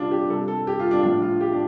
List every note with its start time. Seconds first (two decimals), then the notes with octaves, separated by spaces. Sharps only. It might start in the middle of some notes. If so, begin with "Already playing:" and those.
Already playing: C3 G3 D4 F4
0.11 G4
0.30 C3 G3 A4
0.48 A4
0.67 G4
0.79 F4
0.91 D4
1.03 A2 F3 D4
1.22 F4
1.41 G4
1.52 D4